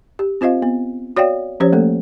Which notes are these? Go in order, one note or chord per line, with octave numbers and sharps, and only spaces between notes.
G4
C4 F4 C5 D#5 F5
B3
F#4 C#5 D5 F5 G5
F3 C#4 G4 C5 C#5
A3 A#3 A4